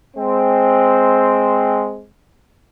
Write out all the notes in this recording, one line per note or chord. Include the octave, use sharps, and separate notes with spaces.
G#3 C4